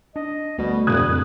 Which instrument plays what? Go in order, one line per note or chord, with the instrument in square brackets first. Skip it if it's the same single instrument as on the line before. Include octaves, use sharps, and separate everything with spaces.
[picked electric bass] D4 [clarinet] D#5
[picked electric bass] D2 A3 [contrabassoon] B2 [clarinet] G3
[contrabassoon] E1 [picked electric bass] F2 A#2 C#3 [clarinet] G3 [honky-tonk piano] D#6 F#6 G#6
[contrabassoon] D1 [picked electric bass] F2